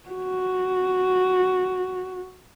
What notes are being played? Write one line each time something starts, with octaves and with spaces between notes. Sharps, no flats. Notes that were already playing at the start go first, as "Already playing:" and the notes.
F#4